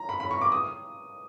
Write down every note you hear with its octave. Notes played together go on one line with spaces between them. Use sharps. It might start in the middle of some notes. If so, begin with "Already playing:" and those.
Already playing: A#5
B5
B5
C#6
D6
D#6